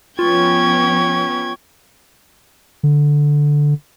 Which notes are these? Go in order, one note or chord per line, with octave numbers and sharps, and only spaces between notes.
F3 B3 C#4 F4 G5 C#6 G#6
D3